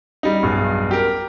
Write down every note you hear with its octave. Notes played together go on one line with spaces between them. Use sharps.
G3 D#4
B1 E2 G2
G4 A#4